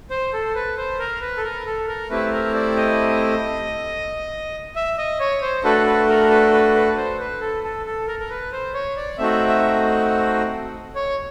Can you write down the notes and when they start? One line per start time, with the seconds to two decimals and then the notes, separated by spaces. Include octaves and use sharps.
0.10 C5
0.33 A4
0.55 B4
0.77 C5
0.99 A#4
1.21 B4
1.37 A4
1.43 A#4
1.66 A4
1.88 A#4
2.10 A3 C4 E4 G4 B4
2.32 A#4
2.54 D5
2.76 D#5
4.76 E5
4.98 D#5
5.20 C#5
5.42 C5
5.64 A3 D4 F#4 A4 B4
5.86 B4
6.09 A#4
6.30 B4
6.53 B4
6.75 B4
6.97 C5
7.19 B4
7.41 A4
7.63 A4
7.86 A4
8.07 A#4
8.20 A#4
8.30 B4
8.52 C5
8.74 C#5
8.96 D5
9.18 A3 C4 D#4 F#4 E5
9.48 E5
10.96 C#5